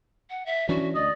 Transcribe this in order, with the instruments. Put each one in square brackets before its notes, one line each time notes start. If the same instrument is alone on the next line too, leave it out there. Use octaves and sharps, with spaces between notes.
[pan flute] F#5
E5
[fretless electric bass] E3 C#4 D4 [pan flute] F#4
[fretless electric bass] D2 [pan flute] D5 [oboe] D#5